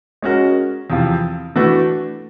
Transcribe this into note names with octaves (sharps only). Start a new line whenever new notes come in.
G#3 C#4 F#4 A#4
E2 C3 F3
E3 A3 D4 F#4 B4